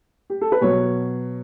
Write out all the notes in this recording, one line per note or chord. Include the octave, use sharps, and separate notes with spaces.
G4
A4
B4
B2 F#3 C#5